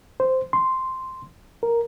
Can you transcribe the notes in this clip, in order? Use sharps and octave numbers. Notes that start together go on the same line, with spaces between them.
C5
C6
A#4